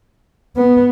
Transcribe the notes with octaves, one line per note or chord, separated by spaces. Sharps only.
B3